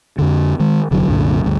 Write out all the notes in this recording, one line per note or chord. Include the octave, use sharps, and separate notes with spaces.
F2 D3
D#3 G#3
F1 D3 F#3
C2 F#2 A#2 D3
D2 G2